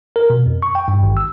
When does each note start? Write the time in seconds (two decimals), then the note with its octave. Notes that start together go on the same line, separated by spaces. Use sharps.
0.16 A#4
0.30 B2
0.46 F2
0.62 C#6
0.75 G5
0.88 G2
1.03 G#1
1.17 E6